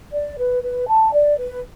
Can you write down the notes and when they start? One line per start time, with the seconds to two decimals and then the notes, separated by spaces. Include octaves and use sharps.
0.12 D5
0.38 B4
0.63 B4
0.87 A5
1.13 D5
1.38 B4